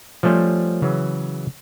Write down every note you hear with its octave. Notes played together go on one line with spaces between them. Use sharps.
F3 G3 A3 C#4 C5
C#3 E3 F#3